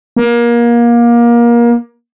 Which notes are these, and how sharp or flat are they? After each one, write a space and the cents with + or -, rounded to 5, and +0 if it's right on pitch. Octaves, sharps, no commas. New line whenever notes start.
A#3 +25